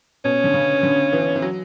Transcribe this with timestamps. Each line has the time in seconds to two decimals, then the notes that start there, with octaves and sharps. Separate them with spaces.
0.24 B2 C#4
0.44 D3
0.54 C#3
0.83 D3
1.13 E3
1.36 E3
1.42 F#3